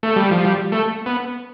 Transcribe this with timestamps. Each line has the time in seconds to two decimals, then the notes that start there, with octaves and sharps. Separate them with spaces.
0.03 A3
0.16 G3
0.31 F3
0.45 G3
0.72 A3
1.06 B3